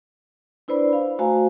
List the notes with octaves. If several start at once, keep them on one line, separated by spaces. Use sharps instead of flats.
D4 E4 B4 C5 D5 B5
F5
A3 F#4 C5 F5 G#5 A#5